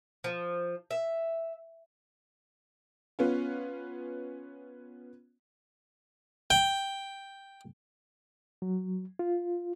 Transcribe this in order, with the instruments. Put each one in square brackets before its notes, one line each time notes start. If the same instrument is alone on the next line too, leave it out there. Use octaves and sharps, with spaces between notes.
[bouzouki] F3
E5
[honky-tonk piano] B3 C#4 F4
[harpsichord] G5
[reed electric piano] F#3
F4